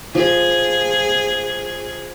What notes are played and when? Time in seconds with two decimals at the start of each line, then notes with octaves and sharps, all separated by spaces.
0.15 F3 G#4